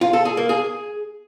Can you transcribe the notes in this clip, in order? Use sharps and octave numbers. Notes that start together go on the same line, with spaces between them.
F4
A4
G#4
A#3
G#4